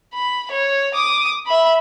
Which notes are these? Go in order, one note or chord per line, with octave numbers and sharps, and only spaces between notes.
B5
C#5
D6 D#6
E5 B5